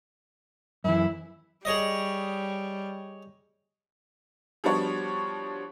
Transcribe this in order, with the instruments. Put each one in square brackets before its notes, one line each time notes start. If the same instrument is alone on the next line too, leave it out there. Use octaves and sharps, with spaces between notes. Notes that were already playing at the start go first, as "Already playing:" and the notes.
[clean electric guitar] F#2 E3 [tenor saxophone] E4
[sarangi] G3 [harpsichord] G#4 C#5 D#5
[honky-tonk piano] F3 G3 B3 D4 F#4 C#5